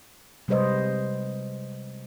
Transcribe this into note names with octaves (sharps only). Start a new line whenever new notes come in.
C3 G3 G#3 B4 C5 D#5